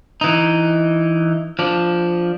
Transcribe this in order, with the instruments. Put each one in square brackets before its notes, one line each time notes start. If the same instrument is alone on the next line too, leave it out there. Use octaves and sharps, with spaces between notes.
[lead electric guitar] E3 D#4
F3 D4